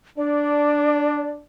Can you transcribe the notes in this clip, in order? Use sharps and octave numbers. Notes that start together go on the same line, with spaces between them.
D4 D5